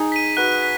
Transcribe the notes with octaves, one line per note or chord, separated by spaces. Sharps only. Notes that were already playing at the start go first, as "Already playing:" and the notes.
Already playing: D#4 G#4
B6 D#7
F#4 B4 F#6
B6